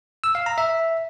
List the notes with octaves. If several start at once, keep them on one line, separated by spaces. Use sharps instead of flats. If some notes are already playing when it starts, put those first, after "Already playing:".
E6
F5
A#5
E5